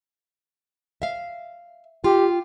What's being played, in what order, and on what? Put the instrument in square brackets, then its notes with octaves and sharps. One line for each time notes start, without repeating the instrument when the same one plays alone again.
[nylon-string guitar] E5 F5
[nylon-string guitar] F4 [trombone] G4